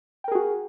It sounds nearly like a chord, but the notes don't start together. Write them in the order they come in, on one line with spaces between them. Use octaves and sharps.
G5 A#4 G#4 F#4